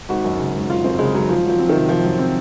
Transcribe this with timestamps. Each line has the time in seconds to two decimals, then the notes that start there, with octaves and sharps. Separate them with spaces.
0.09 G#1 F#4
0.24 F#2
0.39 C#3
0.54 G#1
0.69 G#1 F4
0.84 F#2 C4
0.99 C#3 G#3
1.15 G#1 F#3
1.29 F3 F4
1.44 F#3
1.49 F3
1.59 C4
1.69 C3 D#3
1.89 F3 F4
2.04 F#3
2.19 C4